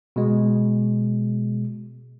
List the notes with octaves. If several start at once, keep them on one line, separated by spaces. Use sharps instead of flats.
B2 G#3